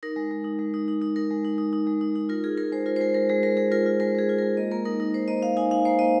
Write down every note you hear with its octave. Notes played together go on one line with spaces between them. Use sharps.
D#4 A#4
G#3
G#3
D#4
G#3
D#4
D#4
D#4
D#4 A#4
G#3
D#4
D#4
D#4
G#3
D#4
D#4
F4 A#4
F4 G#4
F4 A#4
G#3 C5
F4 A#4
C5
G#3 A#4
G#3 A#4
G#3 G#4
G#3 A#4
G#3 G#4
F4 A#4
F4
G#3 A#4
G#3 G#4
F4
G#3 A#4
A#3 D#5
A#3 A#4
D#4 A#4
D#4 A#4
D#4 C5
A#3 D#5
D#4 F5
D#4 G#5
D#4 F5
A#3 C5
A#3 D#5